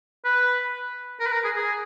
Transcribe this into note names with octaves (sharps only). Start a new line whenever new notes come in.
B4
A#4
B4
A#4
G#4
G#4